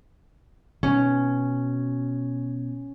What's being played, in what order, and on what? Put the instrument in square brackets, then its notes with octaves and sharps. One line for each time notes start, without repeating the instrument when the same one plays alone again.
[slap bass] B2 [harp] C#4